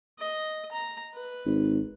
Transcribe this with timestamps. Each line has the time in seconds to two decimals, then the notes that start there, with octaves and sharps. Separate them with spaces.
0.19 D#5
0.72 A#5
1.14 B4
1.46 G#1